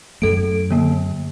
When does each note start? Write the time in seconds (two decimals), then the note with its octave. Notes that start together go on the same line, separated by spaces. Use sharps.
0.22 F#2 F#3 A3 A4 D7
0.70 D3 A#3